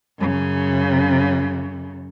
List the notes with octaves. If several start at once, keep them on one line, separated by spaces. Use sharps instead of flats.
F#2 C#3